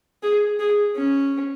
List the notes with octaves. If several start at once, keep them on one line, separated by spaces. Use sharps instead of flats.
G#4
G#4
C#4